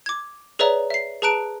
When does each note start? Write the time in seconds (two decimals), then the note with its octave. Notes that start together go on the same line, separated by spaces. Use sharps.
0.06 D6 G#6
0.59 G#4 B4 C#5 D5 E5 A#5
0.90 E5 C7
1.22 G#4 B4 A5 A#5 F#6 D7